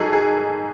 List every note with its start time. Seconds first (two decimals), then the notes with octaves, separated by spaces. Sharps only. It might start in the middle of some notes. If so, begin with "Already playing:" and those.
Already playing: G#2 F#3 G#4 A4
0.13 G#4